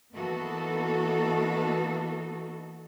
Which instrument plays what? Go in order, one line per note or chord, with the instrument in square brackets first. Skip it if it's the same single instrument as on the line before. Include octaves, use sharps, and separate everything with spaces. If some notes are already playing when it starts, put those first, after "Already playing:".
[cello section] E3 A#3 B3 D#4 F#4 A4